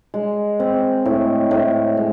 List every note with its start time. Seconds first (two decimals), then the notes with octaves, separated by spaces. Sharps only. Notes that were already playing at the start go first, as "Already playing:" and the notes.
0.14 G#3
0.60 C4
1.06 A2
1.51 A2
1.97 G#3